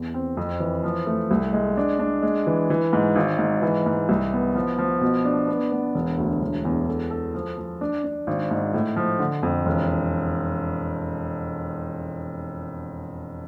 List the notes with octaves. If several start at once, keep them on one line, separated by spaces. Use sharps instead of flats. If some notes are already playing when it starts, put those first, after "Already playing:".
Already playing: E2
C4
F2
E3
F3
A3
C2
G#3
D4
D4
G#3
E3
E3
G#2
G#1
G#2
E3
G#2
C2
B3
F3
F3
B2
D4
B3
B3
E1
D2
E1
E2
A4
A4
F3
F3
D4
D4
G#1
G#2
A2
F3
D3
F2
E1